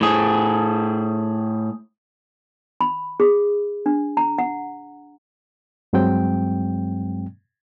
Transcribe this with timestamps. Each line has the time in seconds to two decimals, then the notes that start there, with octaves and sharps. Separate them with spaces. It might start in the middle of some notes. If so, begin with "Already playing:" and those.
0.01 A2 G#4
2.81 B5
3.20 G#4
3.86 D4
4.17 A#5
4.38 F#5
5.93 G2 F#3 G#3 C4 G5